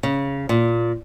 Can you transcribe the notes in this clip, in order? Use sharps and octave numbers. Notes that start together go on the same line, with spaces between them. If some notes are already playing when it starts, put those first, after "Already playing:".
C#3
A#2